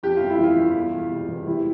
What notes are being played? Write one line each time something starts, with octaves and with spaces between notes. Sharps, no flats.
F2 G4
G1 F4
E4
E3
F4
G1
E2
E1
C3
E3
E3 E4 G4